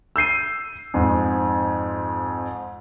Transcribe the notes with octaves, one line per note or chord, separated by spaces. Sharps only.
E6 G6 C7 D#7
F2 G#2